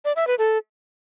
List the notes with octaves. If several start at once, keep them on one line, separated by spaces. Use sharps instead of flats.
D5
E5
B4
A4